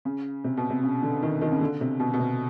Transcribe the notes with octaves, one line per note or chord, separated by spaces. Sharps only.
C#3
C3
B2
C3
C#3
D3
D#3
D#3
C#3
D3
C3
B2
B2
C3